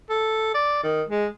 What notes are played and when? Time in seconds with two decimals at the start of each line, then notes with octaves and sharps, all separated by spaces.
0.10 A4
0.55 D5
0.83 D#3
1.09 G#3